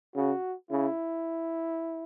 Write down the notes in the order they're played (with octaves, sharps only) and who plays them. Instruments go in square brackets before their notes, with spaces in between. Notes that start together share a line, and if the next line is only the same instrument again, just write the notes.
[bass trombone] C#3 [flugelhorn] F#4
[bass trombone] C#3 [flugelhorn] E4